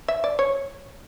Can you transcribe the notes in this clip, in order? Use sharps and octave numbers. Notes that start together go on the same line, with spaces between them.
E5
D5
C#5